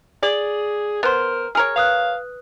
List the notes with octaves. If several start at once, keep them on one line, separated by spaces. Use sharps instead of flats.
G#4 D5
B3 A#4 C5
G#4 A#4 C#5 F6
B4 F5 D#6 F#6